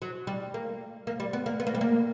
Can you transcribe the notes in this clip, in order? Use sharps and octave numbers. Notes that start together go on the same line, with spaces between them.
F#3
G3
A#3
A#3
G3
B3
A#3
B3
A#3
G3
A#3